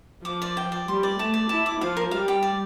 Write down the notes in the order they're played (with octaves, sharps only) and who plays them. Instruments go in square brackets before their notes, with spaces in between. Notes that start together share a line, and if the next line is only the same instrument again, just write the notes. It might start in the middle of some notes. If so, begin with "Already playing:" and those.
[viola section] F3 [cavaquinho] D6
[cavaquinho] D5
G5
D5
[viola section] G3 [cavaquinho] C6
[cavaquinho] D5
[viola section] A3 [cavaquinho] A5
[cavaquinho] D5
[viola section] E4 [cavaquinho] A5
[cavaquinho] D6
[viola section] F3 [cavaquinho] F5
[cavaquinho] A#4
[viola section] G3 [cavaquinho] F5
[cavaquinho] G4
D5